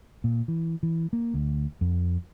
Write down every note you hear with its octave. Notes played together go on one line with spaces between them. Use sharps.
A#2
E3
E3
A#3
D2
F2